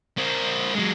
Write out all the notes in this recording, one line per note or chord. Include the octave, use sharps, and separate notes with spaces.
C4 A#4
F#3 G#3